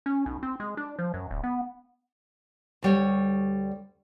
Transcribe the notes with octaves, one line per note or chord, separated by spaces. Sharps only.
C#4
B1
C4
G#3
D4
F3
F#2
D1
B3
D2 G3 C#5